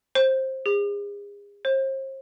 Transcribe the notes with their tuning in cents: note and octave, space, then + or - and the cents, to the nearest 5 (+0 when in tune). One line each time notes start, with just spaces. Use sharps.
C5 +15
G#4 -35
C5 +40